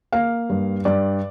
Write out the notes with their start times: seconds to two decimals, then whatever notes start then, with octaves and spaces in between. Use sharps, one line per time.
0.12 A#3 F5
0.50 G2
0.85 G2 D5